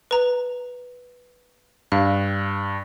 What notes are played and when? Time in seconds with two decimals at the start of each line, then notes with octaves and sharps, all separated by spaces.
0.11 B4 A#5
1.92 G2 F5